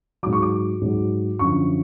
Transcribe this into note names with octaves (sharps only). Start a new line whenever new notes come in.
G#2 F#3 D6
C#6
D6
G#2 F#3
F#2 D3 F3 C#6